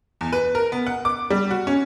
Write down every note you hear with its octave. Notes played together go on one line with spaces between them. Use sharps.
E2
B4
A#4
B3
F#5
D6
G3
F#4
C#4